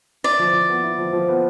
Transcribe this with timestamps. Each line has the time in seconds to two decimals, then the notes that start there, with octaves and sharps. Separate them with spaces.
0.24 E4 D5
0.39 F3
0.53 F3
0.69 B3
0.84 E4
0.98 F3
1.13 F3
1.28 B3